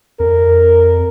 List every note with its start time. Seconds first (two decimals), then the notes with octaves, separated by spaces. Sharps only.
0.20 F2 A#4